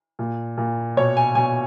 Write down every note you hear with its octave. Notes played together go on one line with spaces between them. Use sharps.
A#2
A#2
B2 C#5
G#5
B2 G#5